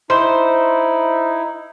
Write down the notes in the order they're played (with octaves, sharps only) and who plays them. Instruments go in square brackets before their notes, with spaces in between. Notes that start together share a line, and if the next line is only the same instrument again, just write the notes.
[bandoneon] D#4 E4 [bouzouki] C5